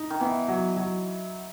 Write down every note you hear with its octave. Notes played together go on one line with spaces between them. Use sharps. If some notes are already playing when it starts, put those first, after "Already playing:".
Already playing: D#4
D#3
E3 B3
F#3
F#3